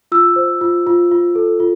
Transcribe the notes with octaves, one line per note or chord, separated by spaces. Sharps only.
F4 E6
C5
F4
F4
F4
A4
F4